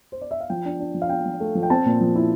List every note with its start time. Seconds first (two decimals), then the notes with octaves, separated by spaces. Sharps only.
0.12 C5
0.21 D5
0.31 E5
0.41 F5
0.50 F3 G5
0.65 D4
0.80 D4
0.94 F3
1.02 F5
1.09 D4 G5
1.26 F3
1.40 A3
1.55 F3
1.63 G5
1.70 C4 A5
1.86 A#2
2.01 F3
2.16 E4